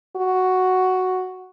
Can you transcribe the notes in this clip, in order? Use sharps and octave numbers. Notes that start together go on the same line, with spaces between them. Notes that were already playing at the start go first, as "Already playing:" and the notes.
F#4